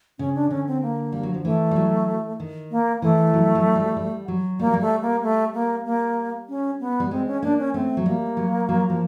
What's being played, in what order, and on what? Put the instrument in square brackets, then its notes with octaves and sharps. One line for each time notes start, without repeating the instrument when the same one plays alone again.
[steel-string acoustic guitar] C#3 [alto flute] C#4
[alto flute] D4
[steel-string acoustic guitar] D3 [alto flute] C#4
[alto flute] C4
A#3
[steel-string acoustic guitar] G3
F#3
F3
[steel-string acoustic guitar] E3 [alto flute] A3
[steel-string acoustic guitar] G3
F#3
D#3
[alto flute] A#3
[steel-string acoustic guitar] E3 [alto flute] A3
[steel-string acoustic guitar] F#3
F#3
G3
G3
F#3
[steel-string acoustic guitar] G3 [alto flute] A#3
[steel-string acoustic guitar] F#3
G3
[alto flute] A3
A#3
A3
A#3
A#3
C#4
B3
[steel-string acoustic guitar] G3
[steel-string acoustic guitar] G#3 [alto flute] C4
[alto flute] C#4
[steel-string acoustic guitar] A#3 [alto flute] D4
[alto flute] C#4
[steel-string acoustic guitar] A3 [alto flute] C4
[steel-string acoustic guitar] F#3
[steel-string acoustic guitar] G3 [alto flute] A#3
[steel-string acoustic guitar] F#3
F#3
F3